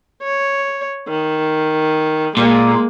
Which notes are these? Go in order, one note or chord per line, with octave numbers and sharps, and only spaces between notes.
C#5
D#3
A#2 G#3 A#3